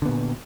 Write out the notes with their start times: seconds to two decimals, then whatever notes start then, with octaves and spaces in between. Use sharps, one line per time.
0.02 D3
0.05 B3
0.09 A#2